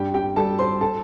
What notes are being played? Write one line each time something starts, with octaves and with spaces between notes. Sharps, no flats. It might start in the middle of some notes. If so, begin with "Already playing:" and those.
Already playing: G2 G4 G5
G4 G5
G3 A4 A5
C5 C6
A4 A5